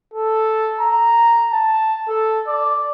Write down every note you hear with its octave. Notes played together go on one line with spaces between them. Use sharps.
A4
A#5
A5
A4
D5